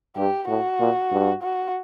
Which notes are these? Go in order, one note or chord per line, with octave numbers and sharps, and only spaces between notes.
G2 G4
A2 F#4
A#2
G2
F#4